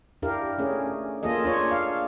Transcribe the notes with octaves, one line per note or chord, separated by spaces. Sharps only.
D4 E4 G4 A#4 F5
A3 C#4 G#4
A#3 F4 G#4 A4 D#5
D4 F4 C#5
F5